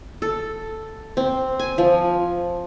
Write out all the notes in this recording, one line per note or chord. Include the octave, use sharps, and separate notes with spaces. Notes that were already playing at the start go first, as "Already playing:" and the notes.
A4
C4
G#5
F3